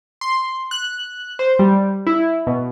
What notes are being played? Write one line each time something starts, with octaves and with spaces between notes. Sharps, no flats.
C6
F#6
C5
G3
E4
B2